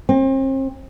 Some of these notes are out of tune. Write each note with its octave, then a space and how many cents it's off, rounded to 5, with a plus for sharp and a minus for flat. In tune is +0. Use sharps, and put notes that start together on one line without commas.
C4 +40